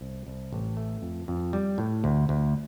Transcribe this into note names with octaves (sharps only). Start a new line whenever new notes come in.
C2
C2
A1
A3
F2
F2
G3
A2
D2
D2